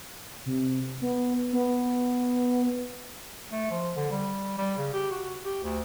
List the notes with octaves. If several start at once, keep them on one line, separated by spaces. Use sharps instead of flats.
C3
B3
B3
A3
F3
D3
G3
G3
C#3
G4
F#4
G4
D2